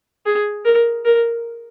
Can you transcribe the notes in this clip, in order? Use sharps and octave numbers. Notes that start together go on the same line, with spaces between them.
G#4
A#4
A#4